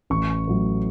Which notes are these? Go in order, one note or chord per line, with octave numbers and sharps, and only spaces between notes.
A1 C#6
A2 F#3